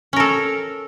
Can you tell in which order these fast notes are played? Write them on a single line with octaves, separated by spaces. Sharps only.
C#4 A#4 A4